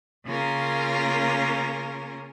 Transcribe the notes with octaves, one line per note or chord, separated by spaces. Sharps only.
C#3 A#3 C#4 F4 A#4